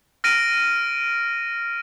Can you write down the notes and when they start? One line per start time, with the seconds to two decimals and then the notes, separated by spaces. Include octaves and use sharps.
0.24 F6 A#6 D7 D#7